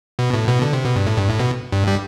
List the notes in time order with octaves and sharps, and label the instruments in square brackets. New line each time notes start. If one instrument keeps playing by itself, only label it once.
[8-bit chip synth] B2
A2
B2
D3
C3
B2
G2
A2
G2
A2
B2
G2
G3